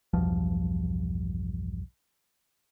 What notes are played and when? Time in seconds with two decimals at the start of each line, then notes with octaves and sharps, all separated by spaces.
0.13 B1 E2 G2 F3